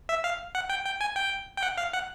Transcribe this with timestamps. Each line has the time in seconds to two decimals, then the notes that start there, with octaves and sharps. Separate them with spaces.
0.09 E5
0.24 F5
0.55 F#5
0.69 G5
0.85 G5
1.01 G#5
1.16 G5
1.57 G5
1.63 F#5
1.77 F5
1.93 F#5